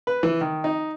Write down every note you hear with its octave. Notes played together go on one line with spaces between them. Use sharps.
B4
E3
D#3
D#4